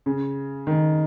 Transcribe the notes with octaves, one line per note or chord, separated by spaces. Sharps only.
C#3
D#3